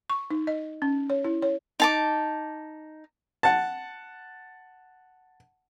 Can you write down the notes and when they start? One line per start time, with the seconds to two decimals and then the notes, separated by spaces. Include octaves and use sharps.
0.10 C#6
0.31 D#4
0.47 D#5
0.82 C#4
1.10 C#5
1.24 E4
1.42 C#5
1.80 D#4 A5 D6
3.43 F#5 A5